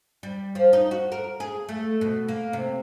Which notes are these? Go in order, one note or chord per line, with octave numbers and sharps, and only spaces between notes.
G3
F3
D#4
F#4
A#4
G#4
A3
B2
A#3
C3